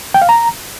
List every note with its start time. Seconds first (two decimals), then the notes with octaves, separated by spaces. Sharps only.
0.14 G5
0.22 F5
0.29 A#5